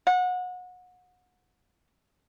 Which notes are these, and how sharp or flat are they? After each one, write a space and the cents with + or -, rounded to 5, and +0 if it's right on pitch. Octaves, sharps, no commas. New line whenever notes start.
F#5 -30